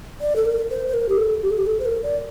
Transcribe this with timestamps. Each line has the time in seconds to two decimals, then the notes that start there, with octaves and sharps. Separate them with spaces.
0.21 D5
0.36 A4
0.46 A#4
0.70 C5
0.88 C5
0.94 A#4
1.09 G4
1.18 A4
1.42 G4
1.50 A4
1.58 G4
1.67 A4
1.80 C5
1.85 A#4
2.03 D5